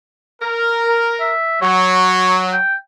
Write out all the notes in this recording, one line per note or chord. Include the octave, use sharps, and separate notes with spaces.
A#4
E5
F#3 C#5
G5